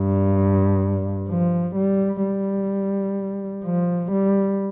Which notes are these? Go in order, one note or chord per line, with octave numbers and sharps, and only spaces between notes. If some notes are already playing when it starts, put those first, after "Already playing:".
Already playing: G2
F3
G3
G3
F3
G3